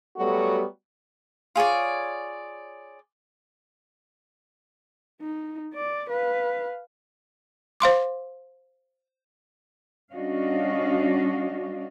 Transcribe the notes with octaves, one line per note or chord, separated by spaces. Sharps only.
F#3 G3 A3 B3 F#4
F4 G#4 C#5 D5
D#4
D5
B4 F5
C5 F5 C6 D6
G3 C#4 D4 F#4 D#5 F5